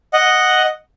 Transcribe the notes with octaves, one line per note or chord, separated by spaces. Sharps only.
D#5 F#5